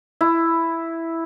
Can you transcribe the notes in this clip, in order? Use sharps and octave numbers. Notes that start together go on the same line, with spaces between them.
E4